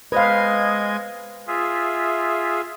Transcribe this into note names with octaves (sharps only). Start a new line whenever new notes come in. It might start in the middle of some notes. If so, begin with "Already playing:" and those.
G#3 B4 C5 D#5 F5 G#6
F4 G#4 E5